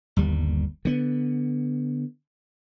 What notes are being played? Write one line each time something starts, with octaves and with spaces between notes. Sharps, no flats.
G1 D#2 G3
D3 B3